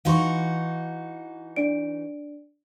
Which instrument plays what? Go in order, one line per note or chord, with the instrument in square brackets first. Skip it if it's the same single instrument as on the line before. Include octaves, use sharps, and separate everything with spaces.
[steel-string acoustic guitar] E3 D#4 F#4 [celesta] F5 C6 C#6
[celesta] D4 D5 D7